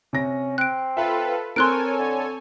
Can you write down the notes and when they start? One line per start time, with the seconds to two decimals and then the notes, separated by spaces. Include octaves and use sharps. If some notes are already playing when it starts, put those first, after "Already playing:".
0.13 C3 C#4 A#6
0.58 C4 F#6 D7
0.97 F4 A4 B4 E5
1.56 C4 A4 A#4 C#5 G#5 C6 F#6 D7
1.99 D3